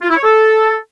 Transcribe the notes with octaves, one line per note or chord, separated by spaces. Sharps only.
F4
E4
C#5
A4